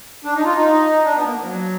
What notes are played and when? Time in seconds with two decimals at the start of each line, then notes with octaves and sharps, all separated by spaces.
0.25 D4
0.36 D#4
0.45 F4
0.55 D#4
1.05 D4
1.15 B3
1.24 A#3
1.41 F3
1.45 F#3